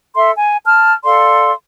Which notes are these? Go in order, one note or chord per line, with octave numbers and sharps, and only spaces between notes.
A4 E5 C6
G#5
A5 F6
A4 D5 F5 C6